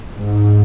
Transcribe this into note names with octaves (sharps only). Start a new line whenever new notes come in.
G#2